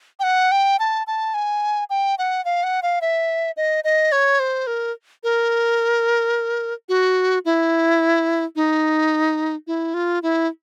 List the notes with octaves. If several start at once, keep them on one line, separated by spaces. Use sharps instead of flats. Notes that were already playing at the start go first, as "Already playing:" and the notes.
G5
F#5
G5
A5
A5
G#5
G5
F#5
F5
F#5
F5
E5
D#5
D#5
C#5
C5
A#4
A#4
F#4
E4
D#4
E4
F4
E4